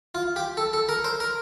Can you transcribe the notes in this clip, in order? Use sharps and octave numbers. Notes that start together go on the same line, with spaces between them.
F4
G4
A4
A4
A#4
C5
A#4